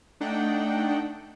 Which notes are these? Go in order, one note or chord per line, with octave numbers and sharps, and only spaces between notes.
A3 D4 D#4 F#5 G5